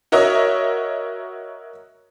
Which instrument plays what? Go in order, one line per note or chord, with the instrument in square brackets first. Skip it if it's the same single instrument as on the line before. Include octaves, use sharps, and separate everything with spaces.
[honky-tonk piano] F#4 A#4 C#5 D#5 E5